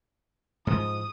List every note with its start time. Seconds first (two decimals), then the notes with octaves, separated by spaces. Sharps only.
0.67 G#2 F3 D#6